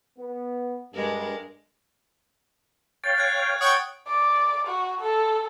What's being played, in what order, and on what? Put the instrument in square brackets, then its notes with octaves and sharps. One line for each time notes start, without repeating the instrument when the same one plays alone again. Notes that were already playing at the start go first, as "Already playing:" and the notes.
[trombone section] B3
[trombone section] G2 [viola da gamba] G#3 D4 A#4
[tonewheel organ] C#5 F5 G5 [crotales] A6
[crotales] F#6 G#6
[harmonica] C#5 F#5 G5 [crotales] D#6 D7
[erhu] D5
F#4
A4